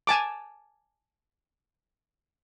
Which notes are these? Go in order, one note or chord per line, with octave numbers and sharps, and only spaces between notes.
G#5 A5 D6